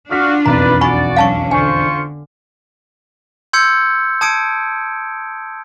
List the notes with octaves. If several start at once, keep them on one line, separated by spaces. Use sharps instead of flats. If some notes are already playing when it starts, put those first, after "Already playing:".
D4 F4 F#4 F5 D6 F6 B6
E1 B1 F2 B4 D5 A#5
F#4 D5 G#5 B5 C#6
F#3 C#4 D4 F5 A5 C#6
D3 F4 C5 G#5 C#6
C6 E6 G6 G#6 C#7
A5 D#6 G#6 C#7 D7